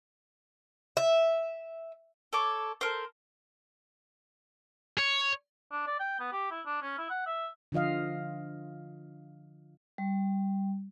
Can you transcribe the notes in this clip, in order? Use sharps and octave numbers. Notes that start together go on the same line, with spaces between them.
E5
A4 C#5 D6
A4 A#4 C5
C#5
D4
D5
G5
B3
G4
E4
D4
C#4
E4
F#5
E5
D3 F3 F4 D#5 F5
G3